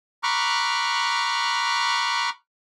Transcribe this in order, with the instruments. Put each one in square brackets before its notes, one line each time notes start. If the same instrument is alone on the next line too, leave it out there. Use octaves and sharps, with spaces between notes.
[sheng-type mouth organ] A#5 B5 C#6 D6 F6 F#6